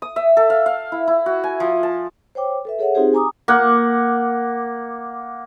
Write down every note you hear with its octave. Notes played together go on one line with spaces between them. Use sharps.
D#6
E5
A4
F5
F5
E4
E4
F#4
G#5
F3
A5
C5 C#5 G5 D6
A4 B4 E5
G#4 A4 C#5 E5 F#5
C4 D#4 F4 G4 G#4 C5
G#5 A#5 D6 D#6
A#3 F#5